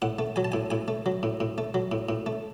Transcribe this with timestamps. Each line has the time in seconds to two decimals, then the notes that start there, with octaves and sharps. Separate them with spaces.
0.02 A2 F#5
0.19 A3
0.36 F#3 G#5
0.45 A5
0.52 A2 G#5
0.70 A2 G#5
0.88 A3
1.06 F#3
1.23 A2
1.40 A2
1.58 A3
1.74 F#3
1.92 A2
2.09 A2
2.26 A3